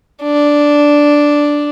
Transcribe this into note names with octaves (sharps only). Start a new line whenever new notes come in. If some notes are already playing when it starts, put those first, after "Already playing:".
D4